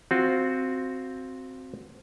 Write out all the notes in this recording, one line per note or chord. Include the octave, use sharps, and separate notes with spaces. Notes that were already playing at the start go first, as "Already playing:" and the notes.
C4 F4 F#4